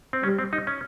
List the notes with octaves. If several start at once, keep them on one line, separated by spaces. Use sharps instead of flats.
C4
G3 C#4
C4
D#4
C#4